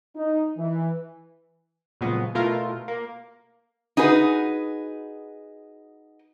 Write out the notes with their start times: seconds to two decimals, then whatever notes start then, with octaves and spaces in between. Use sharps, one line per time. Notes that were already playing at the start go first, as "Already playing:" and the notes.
0.17 D#4
0.57 E3
2.01 A#2 C#3 F3 F#3 G#3 B3
2.35 B2 A3 E4 F4 A4 A#4
2.88 A#3
3.97 D#4 F#4 G#4 B4